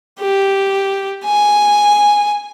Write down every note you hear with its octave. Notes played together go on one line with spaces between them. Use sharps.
G4
G#5